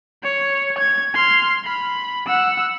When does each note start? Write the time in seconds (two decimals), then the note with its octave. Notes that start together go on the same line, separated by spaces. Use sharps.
0.23 C#5
0.78 G#6
1.14 C6 F6
1.64 B5
2.27 F#5 E6